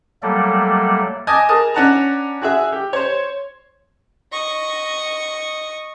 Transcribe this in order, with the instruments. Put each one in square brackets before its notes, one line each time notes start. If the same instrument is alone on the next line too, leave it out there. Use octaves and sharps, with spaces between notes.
[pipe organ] F#3 G3 A3 A#3 A4 D5
[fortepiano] D#5 G#5 A5 D6 D#6
G#4 A#4 A5 D#6
C#4 D4 F#5 A5 A#5
F#4 G#4 E5
G4
C5 C#5
[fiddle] D#5 C#6